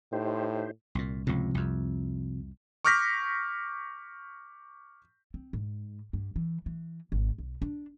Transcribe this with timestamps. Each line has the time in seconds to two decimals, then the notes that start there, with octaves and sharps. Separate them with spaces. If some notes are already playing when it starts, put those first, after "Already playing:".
0.13 A2 D#4 G4 C5
0.95 C2 A#2
1.27 C#2 A2 C3 F3
1.55 C2 F2
2.85 C#6 D6 F6 G6 A#6 B6
5.34 C4
5.53 G#2
6.13 G2
6.36 E3
6.66 E3
7.12 G#1
7.38 B1
7.62 D4